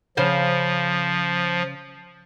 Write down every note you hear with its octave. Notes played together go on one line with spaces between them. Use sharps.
C#3 F3 C5 F5